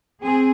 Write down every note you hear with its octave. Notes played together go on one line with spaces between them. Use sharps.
C4 G#4